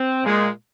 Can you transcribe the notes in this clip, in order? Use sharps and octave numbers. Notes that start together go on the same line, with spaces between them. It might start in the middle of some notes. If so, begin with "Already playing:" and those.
Already playing: C4
A#2 G#3